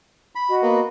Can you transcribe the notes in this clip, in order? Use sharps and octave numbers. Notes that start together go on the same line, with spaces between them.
B5
F#4 D#5
A#3 B3